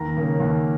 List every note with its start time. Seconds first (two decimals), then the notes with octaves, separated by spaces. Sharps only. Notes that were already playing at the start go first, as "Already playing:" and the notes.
Already playing: D#2 A#5
0.16 C#3 A#3 C#4
0.40 D#2